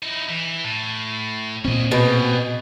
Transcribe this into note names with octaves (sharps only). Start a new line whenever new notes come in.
D#4 E4
E3
A2
A#2 C4 C#4 D#5
B2 G4 G#4